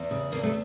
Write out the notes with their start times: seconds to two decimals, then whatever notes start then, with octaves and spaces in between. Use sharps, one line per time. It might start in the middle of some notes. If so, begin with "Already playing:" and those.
Already playing: E2
0.11 C#3
0.32 E2 A#3
0.43 A3